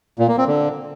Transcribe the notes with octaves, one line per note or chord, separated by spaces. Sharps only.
A#2
A#3
C4
D3